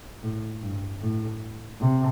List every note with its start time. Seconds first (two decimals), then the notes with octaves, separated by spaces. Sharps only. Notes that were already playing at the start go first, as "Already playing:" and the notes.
0.23 A2
0.62 G2
1.02 A2
1.80 C3